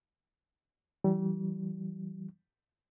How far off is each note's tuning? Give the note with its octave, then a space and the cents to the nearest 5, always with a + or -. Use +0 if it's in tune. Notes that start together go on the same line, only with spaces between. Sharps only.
E3 +0 G3 -35